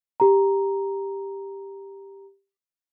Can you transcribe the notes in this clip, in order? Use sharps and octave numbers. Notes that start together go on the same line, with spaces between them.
G4 A#5